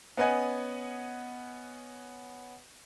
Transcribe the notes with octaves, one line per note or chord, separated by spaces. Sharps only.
B3 C#4 B4 D#5 F#5 G#5